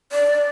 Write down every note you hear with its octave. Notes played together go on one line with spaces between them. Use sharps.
D5